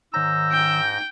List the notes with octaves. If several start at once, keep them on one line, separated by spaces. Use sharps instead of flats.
G#2 D#3 C#5 A#5 E6 G6 A#6
G5